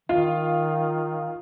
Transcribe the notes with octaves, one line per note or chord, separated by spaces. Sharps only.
D#3 F4